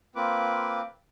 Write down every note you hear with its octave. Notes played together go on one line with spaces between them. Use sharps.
A#3 C4 F4 B4 D6